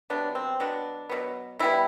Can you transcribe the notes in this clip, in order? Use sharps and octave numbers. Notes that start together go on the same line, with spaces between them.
C3 F#3 B3 D4
C4
B2 F#3 B3 D4
B2 F#3 B3
E3 G3 B3 E4